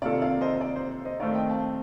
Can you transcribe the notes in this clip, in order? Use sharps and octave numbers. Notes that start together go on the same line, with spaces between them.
C3 D#3 A#3 F4 A4 D5 F5
D5 F5
C5 D#5
C5
D5
C5
C5 D#5
D#3 A3 C4 D5 F5
D#5 G5
F5 A5